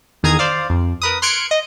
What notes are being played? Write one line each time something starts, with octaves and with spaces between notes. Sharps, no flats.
E2 D#3 G#4 A#5 D#6 G#6
C5 D5 F5
F2
A#4 B4 D#6
C6 F6 F#6 G#6 C#7 D7
D#5